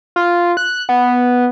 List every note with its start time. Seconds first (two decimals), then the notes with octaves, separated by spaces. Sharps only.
0.16 F4
0.57 F#6
0.89 B3